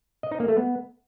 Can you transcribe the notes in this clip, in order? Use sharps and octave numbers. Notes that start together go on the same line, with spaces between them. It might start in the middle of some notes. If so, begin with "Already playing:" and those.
D#5
D#4
A#3
A3
B3